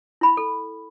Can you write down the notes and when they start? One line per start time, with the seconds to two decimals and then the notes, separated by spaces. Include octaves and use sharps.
0.21 E4 B5
0.37 A4